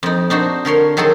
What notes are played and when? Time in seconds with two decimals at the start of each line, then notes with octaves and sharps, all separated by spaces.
0.03 F2 D#4
0.30 D4 D#4 F#4 C5
0.65 D3 A#4 C#5 C6
0.97 D#3 F#3 G#4 A4 C6